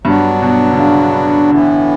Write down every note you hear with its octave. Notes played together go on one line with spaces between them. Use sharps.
G2 F#3 B3 D4 F#4
B2
D3
C#3
A2 D3 E3 B3